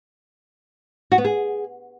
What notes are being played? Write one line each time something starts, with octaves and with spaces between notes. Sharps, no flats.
F#4
B3
G#4